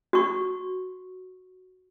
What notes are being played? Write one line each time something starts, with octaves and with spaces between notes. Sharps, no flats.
F#4 C#6